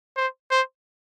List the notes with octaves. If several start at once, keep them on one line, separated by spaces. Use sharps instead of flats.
C5
C5